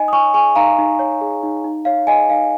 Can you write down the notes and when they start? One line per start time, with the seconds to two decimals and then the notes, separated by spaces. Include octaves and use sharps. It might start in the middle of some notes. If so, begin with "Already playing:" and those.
Already playing: D#4 D#5 G#5
0.08 D#6
0.12 C#5 G#5 C#6
0.34 G#4 G#5 C#6
0.56 D#4 F5 A#5
0.78 D#4
0.99 C#5
1.21 G#4
1.43 D#4
1.64 D#4
1.85 C#5 F5
2.07 G#4 D#5 G#5
2.29 D#4 F5